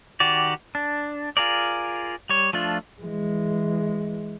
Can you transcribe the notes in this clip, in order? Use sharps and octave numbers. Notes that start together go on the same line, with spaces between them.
D#3 F#4 G4 D5
D4
F4 G#4 A#4 D5
G3 C#5
F3 A3 D4 F4
E3 G#3